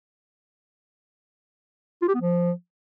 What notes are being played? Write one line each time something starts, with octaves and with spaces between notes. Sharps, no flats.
F4
G4
B3
F3